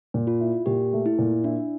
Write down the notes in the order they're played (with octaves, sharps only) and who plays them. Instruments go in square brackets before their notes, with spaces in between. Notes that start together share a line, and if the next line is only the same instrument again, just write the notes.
[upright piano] A#2
[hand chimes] F4
[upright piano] E4
[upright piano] A#2 [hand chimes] G4
[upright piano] A3
[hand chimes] E4
[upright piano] A#2
[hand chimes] D4 [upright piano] E4